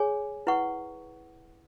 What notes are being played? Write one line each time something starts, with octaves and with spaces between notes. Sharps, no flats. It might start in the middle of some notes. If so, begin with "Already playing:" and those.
Already playing: G#4 C#5 G#5
E4 B4 F#5 C#6